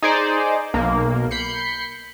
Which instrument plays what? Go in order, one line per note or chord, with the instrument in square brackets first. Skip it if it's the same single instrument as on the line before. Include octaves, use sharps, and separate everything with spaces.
[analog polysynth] D#4 G#4 C5 D5
B1 A#3
B5 G6 C7 C#7